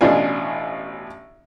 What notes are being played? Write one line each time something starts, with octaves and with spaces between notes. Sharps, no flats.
A1 B2 C#4 D4 F4 G#5